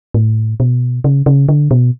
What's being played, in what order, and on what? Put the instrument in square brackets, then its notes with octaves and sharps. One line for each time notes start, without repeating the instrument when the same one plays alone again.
[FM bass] A2
B2
C#3
C#3
D3
B2